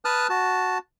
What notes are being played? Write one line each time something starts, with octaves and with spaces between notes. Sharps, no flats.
B4 A5 D#6 F6 F#6
F#4 A5